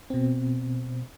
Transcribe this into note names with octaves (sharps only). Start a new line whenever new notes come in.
B2 C4